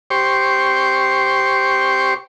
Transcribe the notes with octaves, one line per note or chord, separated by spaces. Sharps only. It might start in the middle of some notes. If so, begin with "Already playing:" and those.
G4 C5 C#6